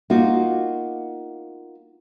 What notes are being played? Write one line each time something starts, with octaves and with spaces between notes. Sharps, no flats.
A#3 D#4 F4 F#4